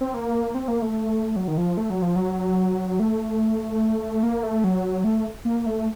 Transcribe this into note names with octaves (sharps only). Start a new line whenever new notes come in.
C4
A#3
C4
A#3
A3
F#3
D#3
F3
A3
F#3
F3
F#3
A3
A#3
A3
F#3
A3
A#3
A3